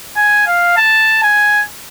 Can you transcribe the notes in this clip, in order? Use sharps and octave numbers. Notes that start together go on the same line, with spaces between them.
G#5
F5
A5
G#5